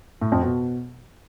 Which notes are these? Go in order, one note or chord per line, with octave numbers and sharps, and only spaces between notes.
A2
F2
B2